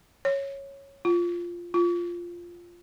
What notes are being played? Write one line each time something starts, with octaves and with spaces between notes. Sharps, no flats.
C#5
F4
F4